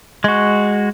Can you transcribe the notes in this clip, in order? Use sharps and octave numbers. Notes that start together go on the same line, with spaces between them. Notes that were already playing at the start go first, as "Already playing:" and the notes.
G#3 F#4